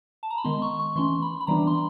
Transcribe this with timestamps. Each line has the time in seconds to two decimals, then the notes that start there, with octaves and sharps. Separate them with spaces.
0.23 A5
0.30 A#5
0.38 B5
0.44 D#3 G#3 B3 C6
0.62 C#6
0.79 C#6
0.96 E3 A3 C#4 C6
1.22 B5
1.40 B5
1.47 E3 G3 B3 D4 A#5
1.67 C6
1.74 B5